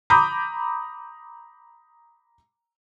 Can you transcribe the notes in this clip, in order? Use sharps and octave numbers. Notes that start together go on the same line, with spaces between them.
A#5 B5 D6 D#6 G6